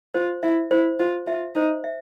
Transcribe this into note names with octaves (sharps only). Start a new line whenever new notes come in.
F4 C5
E4 E5
E4 C5
F4 C5
F4 E5
D#4 C5
E5